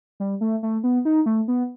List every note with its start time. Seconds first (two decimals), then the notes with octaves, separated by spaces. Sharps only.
0.20 G3
0.41 A3
0.63 A3
0.84 B3
1.05 D#4
1.26 A3
1.48 B3